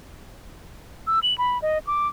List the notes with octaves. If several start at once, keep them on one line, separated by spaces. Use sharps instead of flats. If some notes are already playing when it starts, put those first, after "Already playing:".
E6
F#7
B5
D#5
D6